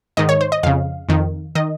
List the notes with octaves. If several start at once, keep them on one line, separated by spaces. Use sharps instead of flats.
G#2 D#3 D#5
C#5
C5
D#5
F2 C#3 F5
F2 D#3
D#3 D#5